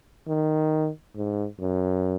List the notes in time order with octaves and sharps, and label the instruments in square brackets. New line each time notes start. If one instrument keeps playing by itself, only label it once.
[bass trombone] D#3
G#2
F#2